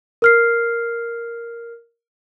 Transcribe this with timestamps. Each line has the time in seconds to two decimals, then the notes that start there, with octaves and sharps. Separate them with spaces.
0.22 A#4 F6 C7